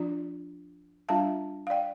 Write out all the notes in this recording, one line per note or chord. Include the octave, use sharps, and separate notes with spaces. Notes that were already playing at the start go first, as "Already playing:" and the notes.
Already playing: F3 D4 F4 D5
G3 D4 F4 F5 A5
F5
D5 G5